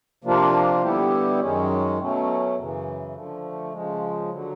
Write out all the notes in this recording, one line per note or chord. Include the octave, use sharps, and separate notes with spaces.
C3 F3 A#3 D4 F4
D3 G3 B3 E4 G4
F#2 D#3 G#3 C#4
B2 F#3 A3 C#4
F#2 C#3 E3
D3 F3 A3
C#3 F3 G#3
D3 F#3